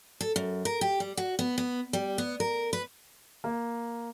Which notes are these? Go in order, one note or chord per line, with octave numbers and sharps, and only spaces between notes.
A4
F#2
A#4
G4
G3
F#4
B3
B3
G3
B3
A#4
B4
A#3